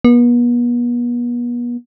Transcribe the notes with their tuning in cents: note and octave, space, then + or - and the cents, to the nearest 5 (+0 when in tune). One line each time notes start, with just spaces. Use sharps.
B3 -40